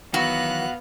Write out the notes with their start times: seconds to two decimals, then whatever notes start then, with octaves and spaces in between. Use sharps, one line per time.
0.14 D#3 E3 F#3 B3 F#4 F5 F#6